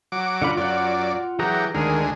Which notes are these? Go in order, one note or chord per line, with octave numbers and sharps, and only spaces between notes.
F#3 D6
D3 F4 B5
F#2 F4 D5 F#5
E3 F#3 G4 G#4 A#5
D2 D#3 G#3 G#4 A#4